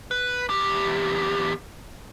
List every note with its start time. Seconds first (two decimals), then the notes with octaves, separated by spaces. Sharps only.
0.11 B4
0.50 E2 G4